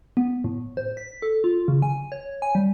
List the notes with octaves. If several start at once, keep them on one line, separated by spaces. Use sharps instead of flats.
B3
A2
C5
B6
A4
F4
C#3
G#5
C#5
G#5
G3